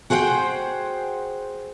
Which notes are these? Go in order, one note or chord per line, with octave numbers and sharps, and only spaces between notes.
F#4 G#4 C5 F5 G5